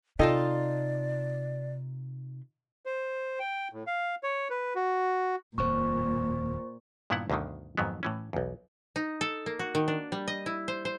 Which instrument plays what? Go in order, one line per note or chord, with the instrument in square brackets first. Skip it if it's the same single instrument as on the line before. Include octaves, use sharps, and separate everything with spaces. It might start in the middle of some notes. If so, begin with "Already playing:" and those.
[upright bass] C3 [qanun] D#4 F4 A5 [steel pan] A4 D#5 G5 [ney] D5
[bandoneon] C5
G5
A2
F5
C#5
B4
F#4
[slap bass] D#1 F2 [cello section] A#2 [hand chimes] C5 C#6
[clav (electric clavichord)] G2 A#2 D#3 B3 E4 F#5
D2 G2 B2 D3 D#3
F2 G#2 D#3 F#3 B3
A2 E3 C#4
B1 E2
[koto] D#4
A4
A#3
F#4
D#3
D4
G3
D#5
E4
C5
C5